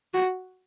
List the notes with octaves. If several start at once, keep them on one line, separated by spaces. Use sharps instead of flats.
F#4